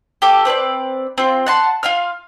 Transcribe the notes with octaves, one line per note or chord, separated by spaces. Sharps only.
G4 A4 D6
C4 B4 C#5 D5
C4 F4
F#5 A5 C6
F4 F5 F6